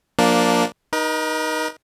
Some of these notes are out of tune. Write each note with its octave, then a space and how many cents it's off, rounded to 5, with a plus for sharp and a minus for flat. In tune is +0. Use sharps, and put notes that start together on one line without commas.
F3 +20 A#3 +0 D4 +0
D#4 +0 A#4 +45